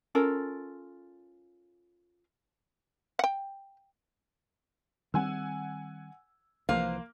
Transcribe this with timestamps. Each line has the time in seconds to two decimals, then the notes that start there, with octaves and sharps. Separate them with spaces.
0.15 C#4 F4 A4 A#4
3.19 F#5 G5
5.14 D#3 G3 C4 F#5 G#5 E6
6.69 C2 E3 F3 A#3 B4 C5 F5